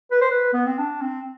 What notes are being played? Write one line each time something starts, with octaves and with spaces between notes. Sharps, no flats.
B4
C5
B4
B3
C4
D4
C4